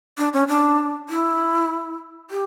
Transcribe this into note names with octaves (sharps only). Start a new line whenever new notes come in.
D4
C#4
D4
E4
G4